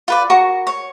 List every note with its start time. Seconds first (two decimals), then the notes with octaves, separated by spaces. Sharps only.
0.08 F4 B4 D5
0.30 F#4 A#4 C#6
0.67 C#5